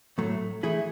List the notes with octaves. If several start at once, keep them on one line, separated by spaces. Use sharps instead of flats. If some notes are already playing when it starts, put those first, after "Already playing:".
A2 F#3 A3
E3 A3 E4 G#4